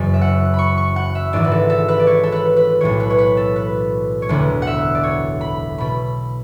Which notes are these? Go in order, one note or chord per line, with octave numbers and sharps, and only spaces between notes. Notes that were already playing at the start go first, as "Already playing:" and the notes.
Already playing: F#1 F#2 E3
E5
F#5
B5
C#6
C#6
F#5
E5
G#1 G#2 E3 D5
B4
A4
A4
B4
D5
C#5
A4
B4
B4
B1 A2 E3 C#5
B4
C#5
B4
A4
B4
C#5
E1 D2 D3 B4
F#5
E5
D5
C#5
B5
B2 B5